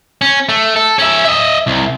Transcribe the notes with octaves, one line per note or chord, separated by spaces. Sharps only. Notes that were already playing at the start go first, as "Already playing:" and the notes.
C#4
A3
A4
C#4 E5
D#5 E5
C2